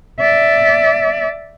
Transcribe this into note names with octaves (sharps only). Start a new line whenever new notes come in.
D5 E5